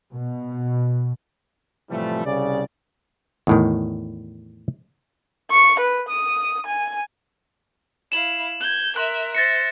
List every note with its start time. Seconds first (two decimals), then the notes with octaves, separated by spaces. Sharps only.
0.12 B2
1.90 A2 C3 E3 F3 G3 A3
2.26 C2 C#3 D5
3.47 E2 A2 D#3
5.50 C#6
5.80 B4
6.09 D#6
6.67 G#5
8.12 E4 F5 E7 F#7
8.60 G6 G#6
8.96 A#4 E5 C6 F#6
9.35 C5 E5 A6 A#6 C#7